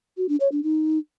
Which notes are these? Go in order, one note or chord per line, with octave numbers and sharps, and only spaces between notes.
F#4
D4
C#5
D4
D#4